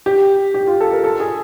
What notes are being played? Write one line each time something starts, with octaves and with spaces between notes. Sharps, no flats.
G4
G4
F4
A4
A#4
A4
G#4